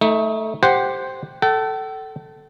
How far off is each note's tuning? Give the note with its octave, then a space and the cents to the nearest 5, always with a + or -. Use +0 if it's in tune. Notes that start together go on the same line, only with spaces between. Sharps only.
A3 +0 D#4 +30
G4 +0 C5 +0 F#5 +0
A4 +0 G5 -45